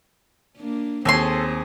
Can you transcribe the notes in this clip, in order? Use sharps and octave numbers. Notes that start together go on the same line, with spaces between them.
A#3 D4
D#2 C4 G#4 A4 C#5 C6